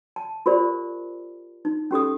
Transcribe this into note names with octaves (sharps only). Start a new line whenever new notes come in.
A5
F4 G4 A#4 C5 D5
D#4
C#4 G4 A4 D#6